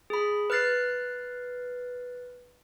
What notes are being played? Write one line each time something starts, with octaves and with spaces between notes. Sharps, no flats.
G#4 B5
B4 F6 F#6 A6 C7